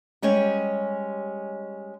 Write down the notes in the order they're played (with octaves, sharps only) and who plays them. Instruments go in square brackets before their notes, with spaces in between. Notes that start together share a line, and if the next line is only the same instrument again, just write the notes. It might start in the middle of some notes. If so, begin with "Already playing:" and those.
[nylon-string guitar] G3 G#3 C#4 G4 C#5